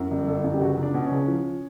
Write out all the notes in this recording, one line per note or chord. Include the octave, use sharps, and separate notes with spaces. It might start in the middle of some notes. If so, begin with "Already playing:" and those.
Already playing: F#2
G1
G1 A4
F#2
G4
C#2 F#4
C#2
D4
B2
C#4
C#2
F3